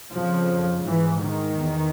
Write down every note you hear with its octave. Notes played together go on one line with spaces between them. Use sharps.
F2 C#3 F3
G#2 E3
D#3
E2